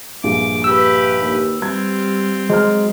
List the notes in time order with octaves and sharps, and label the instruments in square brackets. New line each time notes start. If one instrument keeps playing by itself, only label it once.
[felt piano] A#1 G2 G#4 [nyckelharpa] D6
[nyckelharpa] G4 B4 [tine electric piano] E6
[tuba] D#2
[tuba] G3 [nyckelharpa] C4 F4 [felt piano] G#6
[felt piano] F#3 C5 F6 [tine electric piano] G#3